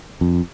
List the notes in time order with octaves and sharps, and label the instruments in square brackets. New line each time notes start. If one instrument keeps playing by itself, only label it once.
[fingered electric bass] F2